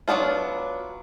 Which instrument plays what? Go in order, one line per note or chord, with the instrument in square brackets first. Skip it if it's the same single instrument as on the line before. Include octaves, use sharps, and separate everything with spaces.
[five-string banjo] F#3 A#3 B3 D4 F4